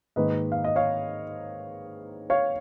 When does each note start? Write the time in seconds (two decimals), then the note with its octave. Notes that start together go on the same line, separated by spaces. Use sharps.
0.16 G#2 D#3 A#3 B4 D#5
0.52 F5
0.64 D#5
0.76 C#5 F5
2.30 C#5 F5